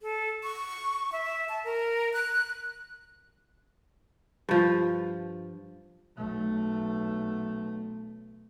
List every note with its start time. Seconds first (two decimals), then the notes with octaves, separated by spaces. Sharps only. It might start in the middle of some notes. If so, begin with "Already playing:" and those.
0.02 A4
0.43 C#6
1.12 E5
1.49 A5
1.64 A#4
2.13 F#6
4.49 G2 F3
6.16 B1 A3